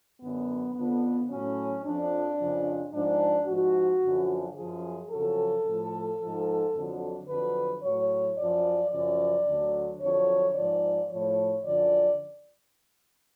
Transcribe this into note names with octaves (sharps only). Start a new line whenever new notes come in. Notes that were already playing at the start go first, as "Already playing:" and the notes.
F#2 D3 F#3 B3
F2 D3 F3 B3
A2 F#3 C#4
F2 F3 D4
F2 C#3 F3
G#2 F3 D4
G#2 F3 F#4
F#2 D3 F3
F#2 F3 G#4
F2 C#3 F#3 A4
A2 F3
G#2 F3
F2 D3 F#3
F2 D3 F#3 B4
A2 F#3 C#5
F#2 F3 D5
F#2 C#3 F3 D5
D2 D3 F#3
F2 D3 F#3 C#5
G#2 F3 D5
A2 F3 C#5
F#2 D3 F3 D5